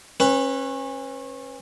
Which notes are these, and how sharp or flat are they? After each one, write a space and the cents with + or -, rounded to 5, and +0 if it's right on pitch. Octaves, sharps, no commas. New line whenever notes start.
C#4 -30 B4 +0